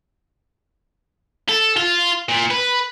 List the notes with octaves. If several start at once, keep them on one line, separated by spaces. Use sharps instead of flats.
A4
F4
A#2
B4